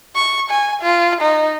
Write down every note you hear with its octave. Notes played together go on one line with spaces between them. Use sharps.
C#6
G#5
F4
D#4